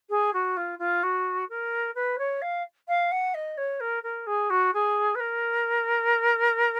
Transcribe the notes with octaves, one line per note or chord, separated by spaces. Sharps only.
G#4
F#4
F4
F4
F#4
A#4
B4
C#5
F5
F5
F#5
D#5
C#5
A#4
A#4
G#4
F#4
G#4
B4
A#4